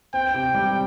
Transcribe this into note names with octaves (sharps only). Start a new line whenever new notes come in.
C4 G5
C3
G3